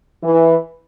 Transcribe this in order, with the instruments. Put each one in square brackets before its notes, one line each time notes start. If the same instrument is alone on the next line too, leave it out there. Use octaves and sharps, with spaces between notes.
[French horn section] E3